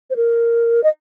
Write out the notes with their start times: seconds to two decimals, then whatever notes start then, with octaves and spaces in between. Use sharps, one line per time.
0.10 C5
0.16 A#4
0.83 D#5